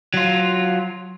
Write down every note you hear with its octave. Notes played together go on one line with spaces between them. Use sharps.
F#3 F4